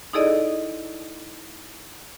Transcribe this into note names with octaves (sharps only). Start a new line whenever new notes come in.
D#4 E4 G#4 A4 D5 D#5